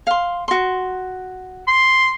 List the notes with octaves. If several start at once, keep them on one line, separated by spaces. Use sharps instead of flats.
F5 C6
F#4 C6
C6